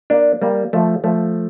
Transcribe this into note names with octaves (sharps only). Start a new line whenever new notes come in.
A#3 D4
G3 A#3
F3 A3
F3 A3